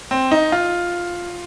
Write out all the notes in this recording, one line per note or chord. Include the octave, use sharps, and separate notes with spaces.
C4
D#4
F4